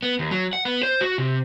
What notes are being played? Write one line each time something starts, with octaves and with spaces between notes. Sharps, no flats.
B3
D#2
F#3
F#5
B3
C5
F#4
C3